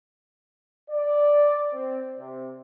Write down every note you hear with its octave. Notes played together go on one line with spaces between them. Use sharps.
D5
C4
C3